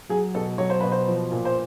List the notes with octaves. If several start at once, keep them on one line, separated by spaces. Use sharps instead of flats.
F#3 G#4
B2 A4
F#3 C#5
C5
B2 B4
C5
F3
A#2
C5